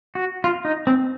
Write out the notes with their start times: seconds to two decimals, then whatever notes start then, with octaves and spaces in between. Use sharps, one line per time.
0.15 F#4
0.44 F4
0.65 D#4
0.87 C4